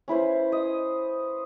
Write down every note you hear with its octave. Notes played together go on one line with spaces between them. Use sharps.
C#4 E4 B4 C5
D#5